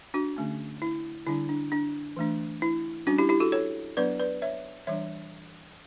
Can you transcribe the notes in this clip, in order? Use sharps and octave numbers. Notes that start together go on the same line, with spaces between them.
D4 F#4
D3 A3 C#4
E4
D3 G3 D4 E4
D4
D4
E3 A3 D4
E4
G3 C#4 D4 F#4
E4 G4
E4 G4
F#4 A4
A4 C#5
F#3 B3 D4 B4 D5
B4 D5
C#5 E5
E3 G3 D4 C#5 E5